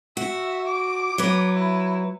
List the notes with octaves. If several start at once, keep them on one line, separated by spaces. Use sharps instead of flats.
F#4 E5
D6
F#3 B4
E4